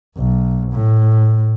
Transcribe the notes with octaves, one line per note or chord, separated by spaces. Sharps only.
B1
A2